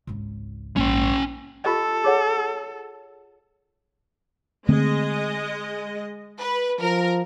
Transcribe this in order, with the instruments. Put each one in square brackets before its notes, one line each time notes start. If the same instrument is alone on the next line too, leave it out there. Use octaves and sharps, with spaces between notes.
[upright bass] G#1 C#2
[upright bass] A#1 G#2 [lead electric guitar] C#4 G5
[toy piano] F4 G4 D#5 [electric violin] A4
[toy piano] G#4 C#5 F#5
[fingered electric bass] D3 A3 C4 [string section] G#3 D#5
[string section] B4
[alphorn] F3 [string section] A#4